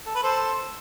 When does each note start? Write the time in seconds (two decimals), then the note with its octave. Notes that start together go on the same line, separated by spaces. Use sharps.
0.06 A4
0.15 B4
0.23 A4 C5